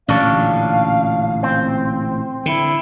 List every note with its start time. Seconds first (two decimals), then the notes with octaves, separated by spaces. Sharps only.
0.08 A1 A#2 D3 C#4 D4 F5
1.43 C4
2.46 D3 E4